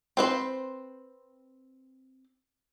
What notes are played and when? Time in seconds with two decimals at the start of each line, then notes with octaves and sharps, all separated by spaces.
0.17 C4 B4 C5